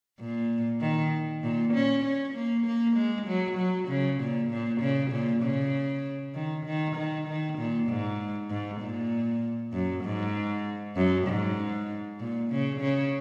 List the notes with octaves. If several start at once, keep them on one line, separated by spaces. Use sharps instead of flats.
A#2
D#3
A#2
C#4
C#4
A#3
A#3
G#3
F#3
F#3
C#3
A#2
A#2
C#3
A#2
C#3
D#3
D#3
D#3
D#3
A#2
G#2
G#2
A#2
F#2
G#2
F#2
G#2
A#2
C#3
C#3